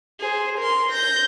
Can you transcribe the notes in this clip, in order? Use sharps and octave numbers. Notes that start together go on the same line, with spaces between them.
G#4 C5
A#4 C6
G6 A#6